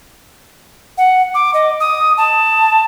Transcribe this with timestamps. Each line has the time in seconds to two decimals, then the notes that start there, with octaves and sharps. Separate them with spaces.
0.98 F#5
1.34 D6
1.54 D#5
1.80 D#6
2.18 A5